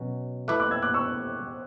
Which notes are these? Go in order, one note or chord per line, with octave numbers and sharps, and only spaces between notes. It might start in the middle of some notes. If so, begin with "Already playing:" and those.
Already playing: B2 F#3 C#4
A3 E4 B4 E5 D6 F#6
D6 F#6
E6 G#6
D6 F#6
C#6 E6